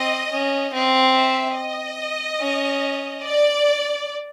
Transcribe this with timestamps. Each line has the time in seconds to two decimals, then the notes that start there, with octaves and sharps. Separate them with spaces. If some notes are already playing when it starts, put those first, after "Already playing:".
Already playing: C4 D#5
0.31 C#4
0.72 C4 F5
1.14 E5
1.56 D#5
2.40 C#4
3.23 D5